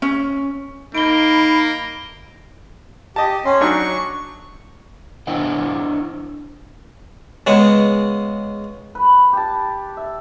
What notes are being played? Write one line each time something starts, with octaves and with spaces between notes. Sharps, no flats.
C#4
A#3 D#4 B5 D7 G7
G4 D#5 A5
C#4 C6
F#3 D4 D#4 C#6
D4 E4 C5 D#5 F#5 G5
C#3 G#3 B3
B4
G4 A5
E5